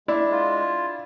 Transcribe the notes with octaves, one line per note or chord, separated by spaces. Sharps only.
G#3 D4 E4
F4